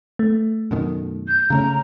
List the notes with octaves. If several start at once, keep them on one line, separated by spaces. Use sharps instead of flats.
A3
F#2 B2 D#3
G6
C#3 A3 C#4 A#5